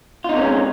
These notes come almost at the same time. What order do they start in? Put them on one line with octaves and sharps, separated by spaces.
F4 D#4 C3 C#4 G#3